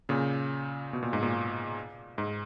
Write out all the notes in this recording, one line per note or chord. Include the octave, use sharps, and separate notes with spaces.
A#2 C#3
B2
A#2
G#2
A#2
G#2